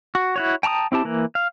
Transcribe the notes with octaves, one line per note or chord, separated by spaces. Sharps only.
F#4
E4 F#4 C#5
G5 A5 A#5 C#6 D#6
C4 E4 G4 A5
E3 A#3
F5